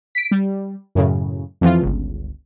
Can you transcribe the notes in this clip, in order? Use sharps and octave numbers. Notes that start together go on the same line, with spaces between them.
B6 D7
G3
F#2 A2 C#3
F2 E3 F3 F4
G1 C#2